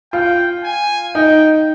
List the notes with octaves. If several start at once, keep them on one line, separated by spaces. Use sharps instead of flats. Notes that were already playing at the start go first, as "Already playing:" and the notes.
F4 G5
G#5
D#4 G5